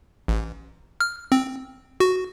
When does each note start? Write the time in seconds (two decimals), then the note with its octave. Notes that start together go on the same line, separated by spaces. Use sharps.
0.28 A1
1.00 F6
1.32 C4
2.00 F#4